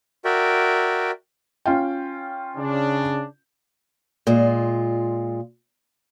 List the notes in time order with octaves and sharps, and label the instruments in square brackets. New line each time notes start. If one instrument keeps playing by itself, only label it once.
[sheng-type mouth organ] F#4 A#4 D5 E5 G5
[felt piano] C#4 F4 G5
[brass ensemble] C#3 D4
[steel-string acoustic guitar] A#2 G#3 F4